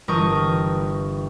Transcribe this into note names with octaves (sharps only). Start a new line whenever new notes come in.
G1 E3 A#4 G5 C#6 D#6